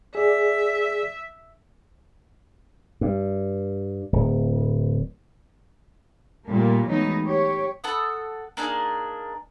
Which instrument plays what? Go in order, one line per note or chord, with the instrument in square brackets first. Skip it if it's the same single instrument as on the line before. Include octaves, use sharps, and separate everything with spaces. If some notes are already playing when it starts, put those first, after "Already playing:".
[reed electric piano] G#4 D5 [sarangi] E5
[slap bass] G2
D1
[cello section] A#2 G3 A3 A#3
E3 F#3 G#3 A3 B3 D#4
G4 C#5
[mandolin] A4 F#5 D#6
A#3 D4 D#4 G#4